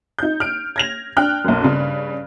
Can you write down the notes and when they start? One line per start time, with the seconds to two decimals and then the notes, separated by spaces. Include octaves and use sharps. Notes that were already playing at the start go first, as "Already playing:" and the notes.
0.19 D#4 G6
0.40 F6 D7
0.76 G#6 A#6 F7
1.17 D4 G5 F6 F#6
1.45 B1 F#2
1.64 G2 C#3